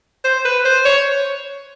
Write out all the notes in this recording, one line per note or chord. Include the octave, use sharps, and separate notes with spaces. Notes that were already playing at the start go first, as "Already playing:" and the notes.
C5
B4
C5
C#5